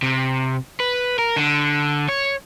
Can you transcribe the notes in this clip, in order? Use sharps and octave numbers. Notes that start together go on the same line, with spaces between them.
C3
B4
A#4
D3
C#5